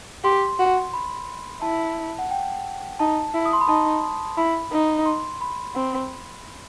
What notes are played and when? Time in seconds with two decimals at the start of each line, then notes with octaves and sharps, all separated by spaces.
0.24 G4 C6
0.59 F#4
0.93 B5
1.62 E4 A5
2.19 F#5
2.31 G5
3.00 D#4 A5
3.34 E4
3.46 D#6
3.53 C6
3.61 B5
3.69 D#4 A5
4.37 E4 B5
4.72 D#4
5.06 C6
5.41 B5
5.75 C4